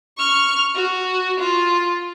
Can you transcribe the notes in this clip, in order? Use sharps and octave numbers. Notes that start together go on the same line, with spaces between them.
C#6 F6
F#4
F4